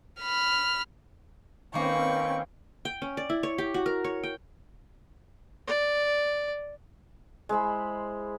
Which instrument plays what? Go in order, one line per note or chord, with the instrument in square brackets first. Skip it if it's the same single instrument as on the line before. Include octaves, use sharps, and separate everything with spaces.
[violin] B5 F6
[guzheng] D#3 A#3 [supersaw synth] C4 C#4 G5 [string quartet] B4 C#6
[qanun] G5
C#4
D5
E4
C#5
G4
F#4
A#4
C#5
G5
[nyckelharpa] D5
[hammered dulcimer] G#3 E4 C5 B5